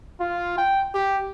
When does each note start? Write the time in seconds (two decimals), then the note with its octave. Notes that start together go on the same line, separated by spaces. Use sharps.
0.20 F4
0.58 G5
0.94 G4